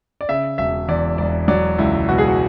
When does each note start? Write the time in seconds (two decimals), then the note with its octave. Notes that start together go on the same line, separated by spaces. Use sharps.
0.21 D5
0.29 C#3 E5
0.58 E1 E5
0.88 E2 D5
1.18 E1 D5
1.48 F#3 D5
1.78 C#2 E4
2.08 B2 F#4
2.18 G#4
2.28 F#4